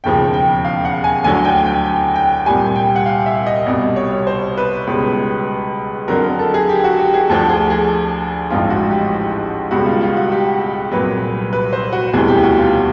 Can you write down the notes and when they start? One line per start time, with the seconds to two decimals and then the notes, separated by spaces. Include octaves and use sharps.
0.04 E1 D#2 C#3 F3 G5
0.34 G5
0.65 F5
0.85 F#5
1.04 G#5
1.24 D2 D3 F#3 G#5
1.45 G5
1.65 G5
1.85 G5
2.16 G5
2.46 C2 A#2 G3 G#5
2.76 G5
2.96 F#5
3.06 F5
3.26 E5
3.47 D#5
3.66 C2 B2 G3 D5
3.96 C#5
4.27 C5
4.57 B4
4.87 C#2 B2 G3
6.08 F2 D3 F#3 A#4
6.24 A#4
6.39 A4
6.54 G#4
6.69 G4
6.84 F#4
7.00 G4
7.14 G#4
7.29 D2 D3 F3 A4
7.49 G#4
7.70 G#4
8.50 A1 G#2 F3 F4
8.70 F#4
8.90 G4
9.71 C#2 B2 G3 F#4
9.86 F4
10.01 F4
10.17 F#4
10.32 G4
10.62 G4
10.92 C2 A#2 F#3 B4
11.53 B4
11.73 C5
11.93 F#4
12.13 E1 D2 C3 E3 G3 G#4
12.28 G4
12.43 F#4
12.59 F4